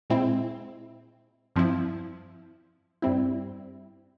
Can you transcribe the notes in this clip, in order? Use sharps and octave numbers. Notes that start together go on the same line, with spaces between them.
A#2 G#3 C4 E4
G2 F3 C4 E4
G2 G3 C4 E4